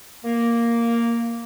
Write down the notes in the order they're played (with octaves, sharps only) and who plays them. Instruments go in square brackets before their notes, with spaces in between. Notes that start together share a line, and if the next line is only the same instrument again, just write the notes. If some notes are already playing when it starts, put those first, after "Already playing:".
[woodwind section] A#3